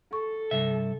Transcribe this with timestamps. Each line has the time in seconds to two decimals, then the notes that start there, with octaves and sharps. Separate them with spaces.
0.13 A4 C#6
0.51 G2 C3 E5